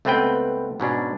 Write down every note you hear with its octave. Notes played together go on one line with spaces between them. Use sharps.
C#2 A3 B3 C4 B4 G5
G#2 B2 C#4 D4